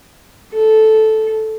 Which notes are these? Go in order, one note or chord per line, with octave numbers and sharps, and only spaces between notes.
A4